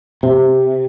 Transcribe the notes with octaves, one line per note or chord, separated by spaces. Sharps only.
C3